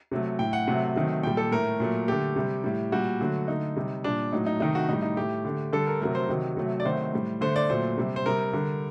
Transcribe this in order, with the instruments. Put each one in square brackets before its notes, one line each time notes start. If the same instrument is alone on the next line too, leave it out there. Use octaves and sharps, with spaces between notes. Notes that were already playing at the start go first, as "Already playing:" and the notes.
[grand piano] C3 F#3 A3
A2 A3 G5
F#5
C3 F#3 A3
C3 D#3 F#3 A3
A#2 G3 G5
A4
A2 A3 A#4
A#2 F#3 A3
D3 A3 G4
C3 G3
A2 G3
A#2 G3 F#4
D3 F#3 A3
D3 A3 D#4
C3 G3
A#2 G3 D4
A2 F#3 A3 D#4
D#4
C3 D#3 A3 D#4
F#4
A2 G3 D#4
D#4
A2 A3 G4
D3 A3
D3 G3 A4
A#4
C3 F#3 A3 A#4
C5
C3 D#3 F#3
C3 F#3 A3
D5
C3 D#3 F#3 A3 C5
A2 G3
D3 A3 C5
D5
A#2 F#3 A3 C5
C3 G3
C5
C3 G3 A#4
D3 G3